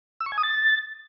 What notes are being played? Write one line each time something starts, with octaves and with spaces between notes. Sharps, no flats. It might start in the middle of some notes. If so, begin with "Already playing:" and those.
E6
C#6
G#5
D#6
A6